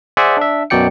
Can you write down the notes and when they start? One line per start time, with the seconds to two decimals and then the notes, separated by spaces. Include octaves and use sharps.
0.17 G#4 C5 D5 E5 F#5 G#5
0.37 D4 E5
0.70 F#2 B2 F#3 D5 G5 C#7